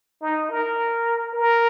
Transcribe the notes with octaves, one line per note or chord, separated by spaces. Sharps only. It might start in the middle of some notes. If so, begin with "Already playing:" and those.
D#4
A#4
A#4